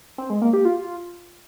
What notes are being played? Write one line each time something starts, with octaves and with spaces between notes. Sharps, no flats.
C4
G#3
A#3
G4
F4